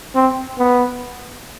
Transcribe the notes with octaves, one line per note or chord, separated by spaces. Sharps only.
C4
B3